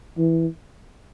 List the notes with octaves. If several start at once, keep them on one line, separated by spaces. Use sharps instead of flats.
E3